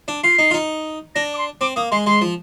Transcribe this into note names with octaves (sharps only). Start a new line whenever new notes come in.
D4
F4 C7
D#4
F4
D#4
D4 A#6
D6
C6
C4 D6
A#3 D#6
G#3 C6
G#3 C6
F3